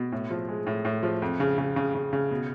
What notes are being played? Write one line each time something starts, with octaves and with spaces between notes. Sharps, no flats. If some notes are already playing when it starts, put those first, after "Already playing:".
Already playing: B2
A2
F3
G#3
A2
A2
F3
F2
C#3
C#3
C#3
C#3
C#3
B2